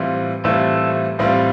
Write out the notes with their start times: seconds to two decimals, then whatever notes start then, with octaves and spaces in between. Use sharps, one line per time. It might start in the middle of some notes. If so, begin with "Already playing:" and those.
Already playing: A2 E3 G3 C4 F4
0.44 A2 E3 G3 A3 C4 F4
1.19 A2 E3 G3 C4 F4